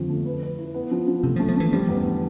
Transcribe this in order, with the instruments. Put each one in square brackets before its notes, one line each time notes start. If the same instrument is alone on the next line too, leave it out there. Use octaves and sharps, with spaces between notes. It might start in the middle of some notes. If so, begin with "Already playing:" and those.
Already playing: [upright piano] F2 F3 [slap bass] D3
[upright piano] A3
B4
B4
E4
B3
F3
F3
[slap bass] C3 [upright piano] A3
[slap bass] F3 [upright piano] A3
[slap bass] F3
[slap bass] E3 [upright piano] A3
[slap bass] F3 [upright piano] G3
[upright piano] E2
D3